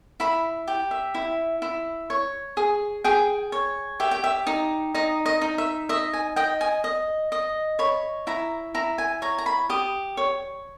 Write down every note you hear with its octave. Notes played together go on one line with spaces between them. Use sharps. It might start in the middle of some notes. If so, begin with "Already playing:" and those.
E4 B5
G4
E5
E4
E4
C#5
G#4
G#4 G5
C#5
G4 E5
G5
E5
D#4
D#4 D#5
D#5
D#4
E5
D#5 E5
G#5
D#5 G5
G#5
D#5
D#5
C#5 B5
E4 A#5
E4 A#5
G#5
C#5 A#5
A#5
B5
G4 D#6
C#5